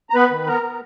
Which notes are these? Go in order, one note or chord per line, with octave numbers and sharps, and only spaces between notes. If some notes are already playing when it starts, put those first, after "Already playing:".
A#5
B3 B4 B5
D#3
B3 A#4 A#5
B3